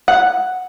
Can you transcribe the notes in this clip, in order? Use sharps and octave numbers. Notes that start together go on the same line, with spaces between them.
F#5